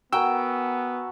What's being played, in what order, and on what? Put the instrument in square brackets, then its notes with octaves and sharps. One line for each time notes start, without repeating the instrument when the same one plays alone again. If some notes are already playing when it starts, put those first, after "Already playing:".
[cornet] B3 [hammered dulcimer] F#4 A#4 G#5 [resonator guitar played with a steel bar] G5 [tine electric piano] E6